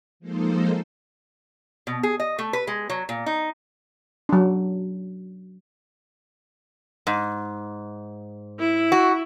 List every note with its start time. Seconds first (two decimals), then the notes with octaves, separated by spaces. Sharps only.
0.20 F3 G#3 A#3 D#4 A4 C5
1.87 B2
2.03 G#4
2.20 D#5
2.39 A3
2.53 B4
2.67 G#3
2.90 F#3
3.09 A#2
3.26 D#4
4.29 F#3 D4
7.07 G#2
8.59 E4
8.92 F#4